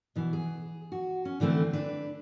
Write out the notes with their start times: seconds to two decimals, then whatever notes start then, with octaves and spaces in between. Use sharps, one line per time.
0.16 B2 E3
0.33 G#4
0.92 F#4
1.25 C#4
1.40 D3 E3 A3 C4
1.73 D4 B4